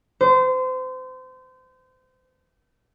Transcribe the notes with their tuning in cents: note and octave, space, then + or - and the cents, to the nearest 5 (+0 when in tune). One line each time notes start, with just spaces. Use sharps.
C5 -30